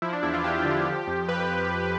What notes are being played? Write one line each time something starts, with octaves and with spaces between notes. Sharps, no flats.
F3 E4
D4
E2 E4
F4
E2 G4
D3
F3
F2
F2 B4